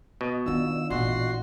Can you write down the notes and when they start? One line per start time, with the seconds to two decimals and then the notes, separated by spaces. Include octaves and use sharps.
0.21 B2 D#5
0.46 D#3 B3 D4 D#4 F4 E6
0.90 A1 E2 A#2 F#4 C6